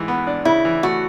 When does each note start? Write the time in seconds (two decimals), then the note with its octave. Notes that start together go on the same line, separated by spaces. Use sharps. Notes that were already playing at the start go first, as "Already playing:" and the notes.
Already playing: G#2 E3
0.08 B3
0.27 D4
0.45 C#3 E4
0.65 E3
0.83 A3 F#4